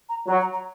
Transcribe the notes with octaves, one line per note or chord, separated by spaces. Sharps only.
A#5
F#3 A#5
A#5
A#5